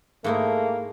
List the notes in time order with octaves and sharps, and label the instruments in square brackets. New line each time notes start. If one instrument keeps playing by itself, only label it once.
[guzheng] G#2 D#4 E4 [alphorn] A3 [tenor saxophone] A#3